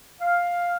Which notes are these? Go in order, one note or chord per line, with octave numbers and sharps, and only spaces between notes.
F5